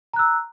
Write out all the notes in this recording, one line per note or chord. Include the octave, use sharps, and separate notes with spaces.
A#5 E6 F#6